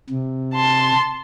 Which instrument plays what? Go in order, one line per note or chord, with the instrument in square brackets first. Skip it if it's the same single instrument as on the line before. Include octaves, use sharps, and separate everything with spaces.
[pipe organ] C3
[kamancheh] A5 C6